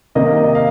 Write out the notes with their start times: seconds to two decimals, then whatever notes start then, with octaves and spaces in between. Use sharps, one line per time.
0.15 C3 D#3 A#3 D#5
0.44 D#5
0.55 F5